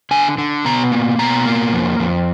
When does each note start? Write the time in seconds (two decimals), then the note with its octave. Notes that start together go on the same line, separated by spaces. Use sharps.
0.11 D3 G#5
0.38 D3
0.65 B2 A#5
0.92 A#3
1.19 B2 A#5
1.46 A#3
1.73 F2
1.99 F2